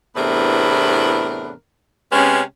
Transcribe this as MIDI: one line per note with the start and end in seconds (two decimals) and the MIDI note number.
0.16 1.51 40
0.16 1.51 45
0.16 1.51 48
0.16 1.51 59
0.16 1.51 62
0.16 1.51 70
2.12 2.40 48
2.12 2.40 56
2.12 2.40 59
2.12 2.40 61